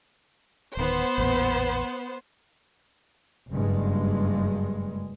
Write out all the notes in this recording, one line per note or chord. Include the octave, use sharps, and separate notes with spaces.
D1 D#3 B3 C5
A1 E2 A#2
F#1 G2 G#3